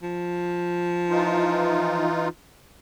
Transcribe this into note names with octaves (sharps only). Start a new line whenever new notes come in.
F3
E3 D#4 F4